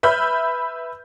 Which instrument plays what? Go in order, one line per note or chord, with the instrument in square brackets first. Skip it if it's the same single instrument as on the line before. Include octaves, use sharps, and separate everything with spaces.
[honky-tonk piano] B4 E5 B5 F6 G6